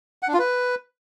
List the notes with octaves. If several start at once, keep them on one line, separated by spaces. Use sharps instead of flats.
F#5
D4
F4
B4